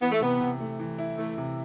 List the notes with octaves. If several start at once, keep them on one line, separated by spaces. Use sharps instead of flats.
E3 B3
A3
C3 B3
C3
A3
E3
E4
E3 A3
C3